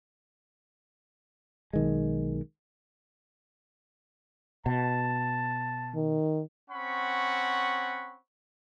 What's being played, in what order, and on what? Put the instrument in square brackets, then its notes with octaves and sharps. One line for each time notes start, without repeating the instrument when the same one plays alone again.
[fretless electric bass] B1 D#3 G#3
[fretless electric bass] B2 [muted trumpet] A5
[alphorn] D#3
[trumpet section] C4 C#4 F#5 B5 C#6